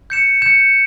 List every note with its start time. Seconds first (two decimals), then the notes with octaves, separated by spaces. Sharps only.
0.10 G6 C#7 E7
0.42 G6 C#7 E7